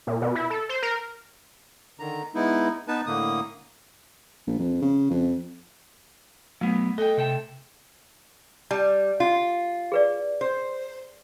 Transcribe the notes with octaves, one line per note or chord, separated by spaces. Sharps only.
A#2
B2
E4
A4
C5
A#4
D3 D#3 A#5
G#3 B3 D#4 E4
B3 D#4 B4 A5
A2 D3 A#3 D#6
A#1
F2
C#3
F2
F#3 A3 B3
A4 D#5 G5
C3 G5 A5
G3 A5
F4
G#4 B4 D5
C5